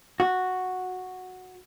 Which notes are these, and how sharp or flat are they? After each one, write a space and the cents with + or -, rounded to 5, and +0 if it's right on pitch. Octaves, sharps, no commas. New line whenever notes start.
F#4 -5